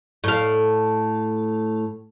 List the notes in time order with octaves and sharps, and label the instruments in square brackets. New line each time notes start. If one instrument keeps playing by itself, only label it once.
[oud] A2 F5